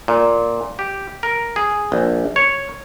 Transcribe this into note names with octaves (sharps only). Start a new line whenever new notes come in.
A#2
G4
A#4
G#4
A#1
C#5